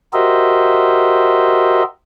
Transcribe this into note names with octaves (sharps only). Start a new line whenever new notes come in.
F#4 G4 A#4 C5 D#5 E5